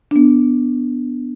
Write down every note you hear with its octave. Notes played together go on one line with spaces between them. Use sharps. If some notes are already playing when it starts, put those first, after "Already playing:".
D4
B3